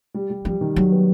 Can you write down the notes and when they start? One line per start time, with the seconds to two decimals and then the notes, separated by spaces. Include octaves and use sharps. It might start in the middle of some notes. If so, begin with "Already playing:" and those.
0.14 G3
0.30 G3
0.45 F3 G3
0.61 D#3
0.76 F#3 G3
0.91 B3